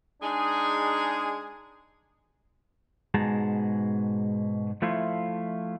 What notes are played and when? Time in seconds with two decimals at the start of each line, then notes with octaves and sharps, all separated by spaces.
0.22 G#3 D4 D#4 G#4
3.14 G#2 B2 G#3 G#4 A5 A#5
4.82 F3 A3 E4 F4